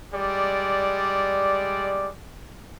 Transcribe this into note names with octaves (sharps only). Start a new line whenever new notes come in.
G3 G#3 D5